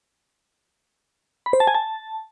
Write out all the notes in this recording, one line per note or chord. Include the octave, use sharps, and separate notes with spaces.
B5
C5
A5
G#5
A5